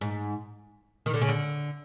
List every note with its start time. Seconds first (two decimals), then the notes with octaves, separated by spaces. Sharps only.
0.01 G#2
1.06 D#3
1.14 D3
1.21 C#3
1.29 D3